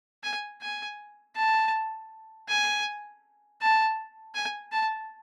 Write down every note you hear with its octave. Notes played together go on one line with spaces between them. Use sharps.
G#5
G#5
A5
G#5
A5
G#5
A5